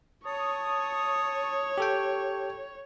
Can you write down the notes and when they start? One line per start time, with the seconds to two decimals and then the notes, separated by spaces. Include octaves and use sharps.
0.25 C#5 A5 C#6 D#6
1.78 G4 A4 G5